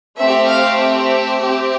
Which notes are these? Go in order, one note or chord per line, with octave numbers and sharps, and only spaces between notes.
A3 C4 G4 E5
F5
E5
C4 G4